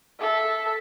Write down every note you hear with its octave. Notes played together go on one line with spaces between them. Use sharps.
A4 E5